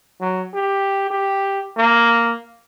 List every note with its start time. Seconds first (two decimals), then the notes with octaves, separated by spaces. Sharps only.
0.21 F#3
0.54 G4
1.10 G4
1.77 A#3